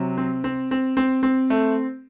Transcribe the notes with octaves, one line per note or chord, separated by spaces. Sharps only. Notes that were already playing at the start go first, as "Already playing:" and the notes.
Already playing: C3 F#3
C4
C4
C4
C4
C4
A3